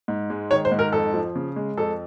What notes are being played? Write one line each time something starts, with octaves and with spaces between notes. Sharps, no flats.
G#2
G#3
D#3 C#5
C5
G#2
A#4
F2 A4
F3
C#3
G#3
F2 A4